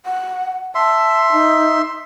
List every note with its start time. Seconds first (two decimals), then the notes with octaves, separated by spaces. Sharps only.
0.06 F#5
0.75 E5 A5 C6
1.32 D#4